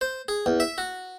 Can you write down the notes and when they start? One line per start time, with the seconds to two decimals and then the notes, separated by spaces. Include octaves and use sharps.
0.01 C5
0.28 G#4
0.46 E2
0.60 E5
0.78 F#4